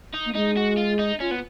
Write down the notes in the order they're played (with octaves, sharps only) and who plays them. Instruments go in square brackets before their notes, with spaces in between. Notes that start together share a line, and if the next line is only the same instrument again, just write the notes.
[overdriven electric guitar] D#4
[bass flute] A#3
[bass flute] G#3 [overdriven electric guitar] D#4
[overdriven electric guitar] F#4
F4
D#4
[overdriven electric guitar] C#4 [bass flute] F4
[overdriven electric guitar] B3